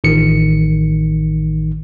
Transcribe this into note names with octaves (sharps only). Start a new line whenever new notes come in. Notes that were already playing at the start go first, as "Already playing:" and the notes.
A1 D#3 C#7